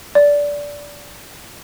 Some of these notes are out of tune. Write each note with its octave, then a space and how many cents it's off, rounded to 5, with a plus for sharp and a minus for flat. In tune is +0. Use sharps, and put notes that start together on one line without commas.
D5 -15